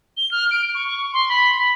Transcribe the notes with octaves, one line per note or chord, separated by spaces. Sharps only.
G7
F6
D7
C#6
C6
B5
B5